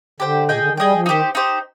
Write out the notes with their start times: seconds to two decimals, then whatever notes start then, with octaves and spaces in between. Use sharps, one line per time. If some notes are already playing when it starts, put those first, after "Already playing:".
0.20 D3 G4 C5 G5
0.48 A#2 G#4 D#5 G5
0.59 D3
0.68 D#3
0.77 G3 G#4 D#5 G5
0.92 F3
1.06 D#3 D#4 G4 C5
1.35 D#4 G4 C5